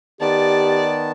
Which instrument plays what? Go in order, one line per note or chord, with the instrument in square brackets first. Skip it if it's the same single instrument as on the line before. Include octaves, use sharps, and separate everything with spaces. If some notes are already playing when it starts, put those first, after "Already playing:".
[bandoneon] D#3 B3 A5 [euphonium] G4 [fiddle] D5